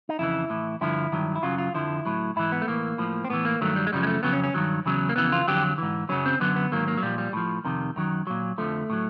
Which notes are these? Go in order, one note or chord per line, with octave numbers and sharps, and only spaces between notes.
D#4
F2 C#3 E3 E4
A2 E3
G2 D3 F3 E4
G2 D#3 F#3
E4
F#2 C#3 F#3 F4
F4
F2 D3 F3 E4
A2 F#3
G#2 E3 E4
B3
A3
A2 E3 A#3
A2 F3
C4
A2 E3 B3
A#3
G2 D#3 F#3 A3
G3
G#3
F#2 C#3 F3 G3
G#3
A3
F2 C#3 F#3 B3
C#4
C#4
G2 D#3 F#3
E2 C#3 F#3
A#3
F2 C#3 E3 B3
F4
F2 D3 F#3 G4
G#2 E3
F#2 C#3 F#3 C#4
C4
F#2 D3 F#3 B3
B3
G#2 D#3 F#3 A#3
A#3
F#3
A#2 F3 G3
G3
A2 F3
F2 C3 D#3
F#2 D#3 F#3
A#2 F#3
F2 D3 F3 A3
A2 F#3